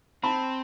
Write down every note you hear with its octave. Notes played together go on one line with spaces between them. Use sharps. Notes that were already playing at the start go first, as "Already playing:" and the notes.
C4 A5 B5